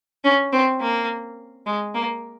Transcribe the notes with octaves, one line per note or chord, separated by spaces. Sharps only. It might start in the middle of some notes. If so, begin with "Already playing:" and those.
C#4
C4
A#3
G#3
A#3